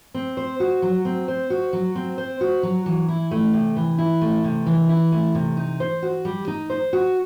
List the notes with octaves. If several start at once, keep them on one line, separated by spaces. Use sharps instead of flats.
C4
C5
F#4
F#3
C4
C5
F#4
F#3
C4
C5
F#4
F#3
E3
E4
A3
C3
E3
E4
A3
C3
E3
E4
A3
C3
D#4
C5
F#4
G3
D#4
C5
F#4